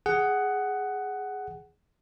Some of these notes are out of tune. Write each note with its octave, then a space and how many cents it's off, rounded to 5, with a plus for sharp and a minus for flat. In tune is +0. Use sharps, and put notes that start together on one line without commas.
G#4 +0 F#5 +10